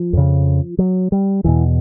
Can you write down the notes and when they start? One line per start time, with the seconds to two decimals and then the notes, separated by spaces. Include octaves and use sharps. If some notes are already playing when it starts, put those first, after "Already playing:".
Already playing: F3
0.13 F2 C#3
0.79 F#3
1.12 G3
1.44 E2 B2 E3